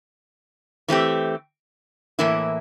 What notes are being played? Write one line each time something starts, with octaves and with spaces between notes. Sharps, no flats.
E3 A3 C4 G4
A2 E3 A#3 E4